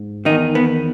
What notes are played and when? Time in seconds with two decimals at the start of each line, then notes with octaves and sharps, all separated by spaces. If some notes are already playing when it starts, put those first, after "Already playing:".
Already playing: G#2
0.25 E2 D#3 D#4
0.55 B3